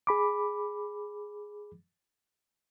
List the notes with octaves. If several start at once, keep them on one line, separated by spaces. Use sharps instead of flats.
G#4 B5 D6